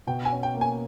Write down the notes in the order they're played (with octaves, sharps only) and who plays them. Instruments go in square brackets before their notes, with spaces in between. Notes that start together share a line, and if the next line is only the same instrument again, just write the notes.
[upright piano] B2 [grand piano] G5
[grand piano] G#5
[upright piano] C#4
[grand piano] G5
[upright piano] A#3
[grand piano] G#5